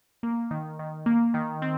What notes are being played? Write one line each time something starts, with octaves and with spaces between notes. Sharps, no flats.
A#3
D#3
D#3
A#3
D#3
C4